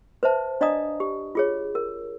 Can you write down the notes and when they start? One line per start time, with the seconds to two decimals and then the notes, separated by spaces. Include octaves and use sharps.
0.23 B4 C5 E5 A5
0.61 D4 D5 D#5 F5 A#5 D#6
1.00 G4
1.35 F4 G#4 C#5
1.75 A#4